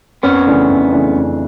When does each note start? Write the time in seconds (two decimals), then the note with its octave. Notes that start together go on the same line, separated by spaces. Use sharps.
0.23 F2 B3 C#4
0.46 C#3 E3 A3 D4
0.69 F2
0.92 C#3 E3 A3 D4
1.16 F2